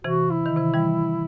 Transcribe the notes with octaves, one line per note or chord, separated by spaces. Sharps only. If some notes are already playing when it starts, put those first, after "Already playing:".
C3 E3 F#4
E4
D#3
C3 E3
E3 G3